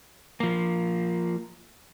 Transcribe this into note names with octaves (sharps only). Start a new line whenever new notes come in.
F3 A#3